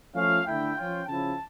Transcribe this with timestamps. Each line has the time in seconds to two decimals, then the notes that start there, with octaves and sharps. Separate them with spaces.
0.15 F3 A3 C#4 F4 F5
0.47 D3 A3 E4 G5
0.77 F3 C#4 F4 G5
1.08 C#3 F3 C#4 E4 A5